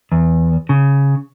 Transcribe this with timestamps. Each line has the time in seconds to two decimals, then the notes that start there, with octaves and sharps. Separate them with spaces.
0.12 E2
0.69 C#3